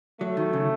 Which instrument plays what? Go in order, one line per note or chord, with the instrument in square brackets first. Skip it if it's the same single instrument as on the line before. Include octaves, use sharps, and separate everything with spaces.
[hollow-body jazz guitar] F#3 [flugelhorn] A3
[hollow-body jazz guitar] D#3
C#3